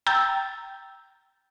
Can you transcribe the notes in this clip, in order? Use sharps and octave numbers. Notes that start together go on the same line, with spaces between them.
G5 A#5 E6 G6 A6